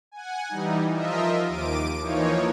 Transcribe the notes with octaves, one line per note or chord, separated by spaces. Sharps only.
F#5 G#5
E3 G3 D#4
F3 F4 A#4 D#5 E5
D#2 D6 D7 D#7
E3 F3 A#3 D#4 C#5